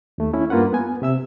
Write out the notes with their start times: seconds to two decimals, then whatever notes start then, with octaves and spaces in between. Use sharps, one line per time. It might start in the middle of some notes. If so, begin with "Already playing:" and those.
0.18 D#2 A3
0.34 C#4 E4
0.50 G2 A#3 F4 B4 F#5
0.73 B3 G#5
1.02 C3 E5 E6